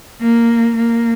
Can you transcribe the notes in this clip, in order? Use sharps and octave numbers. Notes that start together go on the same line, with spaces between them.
A#3
A#3